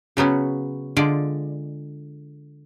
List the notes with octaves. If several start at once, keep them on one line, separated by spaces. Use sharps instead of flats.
C#3 F#3 B3 C#4
D3 G#3 F4 D5